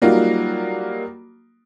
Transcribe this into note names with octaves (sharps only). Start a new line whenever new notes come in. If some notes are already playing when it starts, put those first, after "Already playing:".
F#3 G3 A#3 D#4 F4 F#4